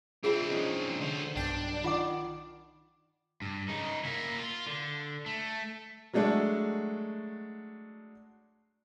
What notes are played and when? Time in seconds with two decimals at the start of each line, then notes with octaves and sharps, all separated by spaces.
0.24 C4 D4 F4 G#4 E5
0.49 F3 C#4 D#4
1.01 D3 C5
1.35 B1 G2 D4 G5
1.84 D#3 F4 F#5 D6
3.42 G2
3.69 C#3 D#4
4.05 A#3 E4
4.39 F4
4.66 D3
5.26 A3
6.13 F#3 G#3 A3 D4 F#4